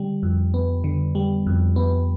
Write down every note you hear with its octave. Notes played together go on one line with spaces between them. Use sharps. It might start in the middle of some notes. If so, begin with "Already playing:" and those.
Already playing: D3 G3
F2
B3
D3
G3
F2
B3